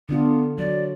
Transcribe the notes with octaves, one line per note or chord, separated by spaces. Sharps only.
D3 B3 D4 F4
F#3 D5